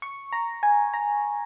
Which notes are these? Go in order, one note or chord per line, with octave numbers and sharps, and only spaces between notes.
C#6
A#5
G#5
A#5